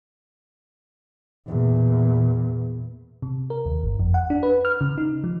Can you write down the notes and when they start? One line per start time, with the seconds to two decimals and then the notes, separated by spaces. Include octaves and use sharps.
1.47 E2 A#2
3.22 C3
3.50 A#4
3.66 D#2
3.83 G1
3.99 F2
4.14 F#5
4.30 D4
4.43 B4
4.65 F6
4.81 C#3
4.98 D#4
5.24 F3